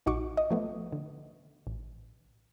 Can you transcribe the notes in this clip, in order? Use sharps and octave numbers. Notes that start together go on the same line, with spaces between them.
A#1 D#4 F#4 C#6 D6
D#5
F3 A3 B3
D3
A1